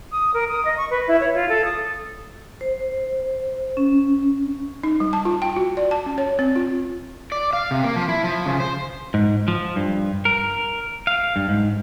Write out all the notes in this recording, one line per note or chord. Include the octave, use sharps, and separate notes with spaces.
D#6
A#4
D#6
D#5
C#6
B4
E4
C#5
F4
A4
D#6
C5
C#4
D#4
G3
A5
F4
G5
F#4
D5
A5
C#4
C#5
C4
F4
D5
F5
C3
A#3
F3
E4
F3
C#3
C5
G#2
F3
G2
A#4
F5
G2
G#2